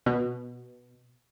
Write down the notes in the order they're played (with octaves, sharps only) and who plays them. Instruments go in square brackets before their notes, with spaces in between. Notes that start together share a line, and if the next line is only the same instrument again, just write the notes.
[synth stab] B2